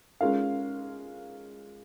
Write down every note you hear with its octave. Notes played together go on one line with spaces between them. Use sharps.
G#3 C#4 F4 A#4 F5